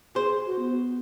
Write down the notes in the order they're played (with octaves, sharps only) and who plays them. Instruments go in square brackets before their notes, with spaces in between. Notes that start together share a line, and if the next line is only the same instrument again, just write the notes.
[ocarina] G#4 [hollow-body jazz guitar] C5
[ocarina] F#4
B3